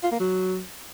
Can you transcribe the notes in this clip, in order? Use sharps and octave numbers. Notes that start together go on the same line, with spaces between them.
F4
A#3
F#3